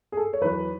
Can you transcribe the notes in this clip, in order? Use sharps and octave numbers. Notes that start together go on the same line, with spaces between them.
G#4
A4
C#5
E2 D#3 F#3 B4